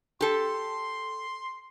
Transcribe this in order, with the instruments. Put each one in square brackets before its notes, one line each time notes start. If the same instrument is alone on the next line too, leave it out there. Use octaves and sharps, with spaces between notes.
[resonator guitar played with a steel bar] G4 A4 [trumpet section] C6